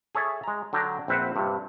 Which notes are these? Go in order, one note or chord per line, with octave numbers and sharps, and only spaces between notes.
G#4 A4 C#5 E5 A5
G#3 A#5
D3 F#3 D4 G5 A#5
A#1 C4 B4 E5 F#5
G2 C3